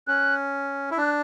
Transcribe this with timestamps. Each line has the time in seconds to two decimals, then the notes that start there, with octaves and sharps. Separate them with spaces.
0.07 C#4 F#6
0.91 E4
0.98 D4 F#6